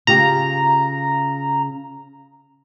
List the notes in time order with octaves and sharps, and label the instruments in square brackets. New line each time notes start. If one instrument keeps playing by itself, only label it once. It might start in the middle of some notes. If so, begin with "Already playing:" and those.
[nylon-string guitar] C#3 F4 G4 [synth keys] A#5